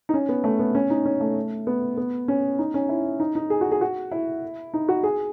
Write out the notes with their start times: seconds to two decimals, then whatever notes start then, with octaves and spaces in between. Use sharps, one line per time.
0.09 D#4
0.14 C#4
0.29 B3
0.44 A3
0.59 B3
0.75 C#4
0.90 D#4
1.05 C#4
1.21 A3
1.67 B3
1.97 B3
2.28 C#4
2.59 D#4
2.74 C#4
2.89 E4
3.20 D#4
3.35 D#4
3.50 G#4
3.61 F#4
3.72 G#4
3.81 F#4
4.12 E4
4.74 D#4
4.89 F#4
5.03 G#4